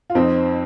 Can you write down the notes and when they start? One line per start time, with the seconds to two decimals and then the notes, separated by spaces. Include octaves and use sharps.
0.10 F4
0.15 F2 C4 D#4